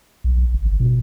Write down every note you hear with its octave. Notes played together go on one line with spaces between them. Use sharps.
B1
G1
B2